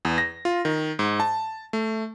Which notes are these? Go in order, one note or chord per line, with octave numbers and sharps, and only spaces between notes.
E2
A#6
F4
D#3
G#2
A5
A3